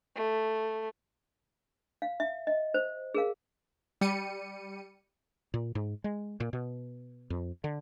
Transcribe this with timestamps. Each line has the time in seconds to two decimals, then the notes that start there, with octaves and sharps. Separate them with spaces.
0.15 A3
2.02 F5
2.20 E5
2.47 D#5
2.74 C5
3.15 G#4 A#4 F5
4.01 G3 C#7 D#7
5.54 A#2
5.75 G#2
6.04 G#3
6.40 A#2
6.53 B2
7.30 F2
7.64 D3